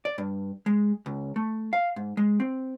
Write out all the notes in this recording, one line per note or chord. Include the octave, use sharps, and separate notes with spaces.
D5
G2
G#3
C#2
A3
F5
G#2
G#3
C4